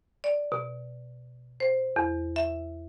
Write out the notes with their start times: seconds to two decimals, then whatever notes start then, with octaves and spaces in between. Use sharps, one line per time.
0.24 D5
0.52 B2
1.60 C5
1.96 E2
2.36 E5